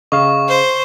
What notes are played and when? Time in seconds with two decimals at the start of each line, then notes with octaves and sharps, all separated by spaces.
0.12 C#3 D#5 F5 C#6
0.48 C5